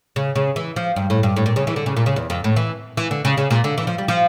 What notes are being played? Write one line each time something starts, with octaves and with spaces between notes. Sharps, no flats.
C#3
C#3
E3
F3
G2
A2
G2
A2
A#2
C#3
E3
D3
C#3
A#2
C#3
E2
F2
A2
E3
E3
D3
C#3
C#3
A#2
D3
E3
F3
G3
F3